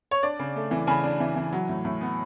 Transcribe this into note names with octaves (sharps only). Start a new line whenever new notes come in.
C#5
D4 D5
C#3
A3
E3
C#3 G#5 B5
D4
E3
E3
F#3
A2
A2
B3